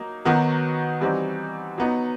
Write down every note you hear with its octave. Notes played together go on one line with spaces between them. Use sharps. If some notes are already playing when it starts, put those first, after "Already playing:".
Already playing: F#3 A#3 D#4
D#3 F#3 B3 D#4 F#4
E3 G3 C4 D#4 F#4
F#3 B3 D#4